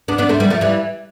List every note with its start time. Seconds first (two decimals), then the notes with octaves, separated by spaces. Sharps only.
0.08 B3 D4
0.18 B3 D4
0.29 A3 C4
0.40 G3 B3
0.50 F3 A3
0.61 E3 G3